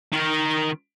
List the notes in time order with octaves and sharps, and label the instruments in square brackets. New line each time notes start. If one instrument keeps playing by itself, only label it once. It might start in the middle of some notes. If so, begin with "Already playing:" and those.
[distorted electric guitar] D#3 A#4